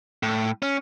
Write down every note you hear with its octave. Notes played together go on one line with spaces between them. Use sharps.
A2
C#4